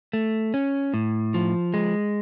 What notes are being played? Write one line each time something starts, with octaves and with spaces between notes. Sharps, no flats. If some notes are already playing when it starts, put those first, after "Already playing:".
A3
C#4
A2
F3
G#3